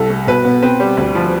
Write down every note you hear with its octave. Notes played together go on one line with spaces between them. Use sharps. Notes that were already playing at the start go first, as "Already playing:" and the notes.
Already playing: C2 A4
A3
B2 B4
B3
C4 B4
G3
D2
F3